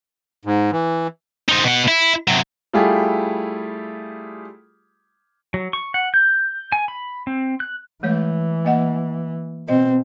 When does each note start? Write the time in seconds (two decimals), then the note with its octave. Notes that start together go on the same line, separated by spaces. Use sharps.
0.45 G#2
0.72 E3
1.49 C4 D#4
1.64 B2 F#5
1.88 E4
2.28 C3 F#3
2.73 G3 A3 E4 F4 G4 G#4
5.54 F#3
5.73 C#6
5.94 F#5
6.14 G6
6.72 G#5
6.88 B5
7.27 C4
7.60 F#6
8.03 E3 G#3 A3 C#5
8.65 A#3 D#5 F#5
9.68 B2 C4 D#5